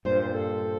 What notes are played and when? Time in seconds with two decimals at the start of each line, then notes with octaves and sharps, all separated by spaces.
0.05 G2 A#2 C5
0.20 C5
0.34 A4